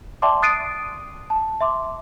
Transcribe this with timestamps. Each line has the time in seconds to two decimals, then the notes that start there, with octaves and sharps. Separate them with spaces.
0.22 D5 E5 G5 A5 C6 D6
0.42 D#6 F#6 A6 C7 D7 D#7
1.30 A5
1.61 E5 C6 D6